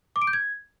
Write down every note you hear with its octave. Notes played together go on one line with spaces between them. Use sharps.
D6
D7
G6
G#6